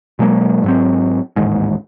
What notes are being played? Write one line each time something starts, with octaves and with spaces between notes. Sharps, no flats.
B2 F#3 G#3 A#3
G#2 F#3 C4
A1 D#2 G#2